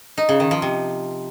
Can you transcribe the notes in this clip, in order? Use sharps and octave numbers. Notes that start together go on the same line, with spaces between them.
D#4
C#3
D#3
F3
C3